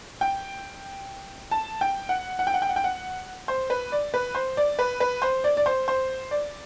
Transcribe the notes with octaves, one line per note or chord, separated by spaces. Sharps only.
G5
A5
G5
F#5
F#5
G5
F#5
G5
F#5
G5
F#5
C5
B4
D5
B4
C5
D5
B4
B4
C5
D5
D5
C5
C5
D5